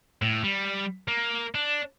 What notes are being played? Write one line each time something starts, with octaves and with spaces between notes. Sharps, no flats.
A2
G3
A#3
D4